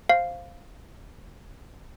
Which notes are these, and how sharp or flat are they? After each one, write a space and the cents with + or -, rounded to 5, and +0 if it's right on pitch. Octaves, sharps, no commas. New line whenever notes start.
C5 +5 F5 +0